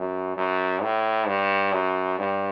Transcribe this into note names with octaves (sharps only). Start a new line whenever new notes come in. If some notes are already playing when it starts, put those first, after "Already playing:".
Already playing: F#2
F#2
A2
G2
F#2
G2